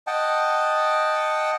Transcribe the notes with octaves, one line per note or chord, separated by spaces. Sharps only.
D#5 F#5 G5 A5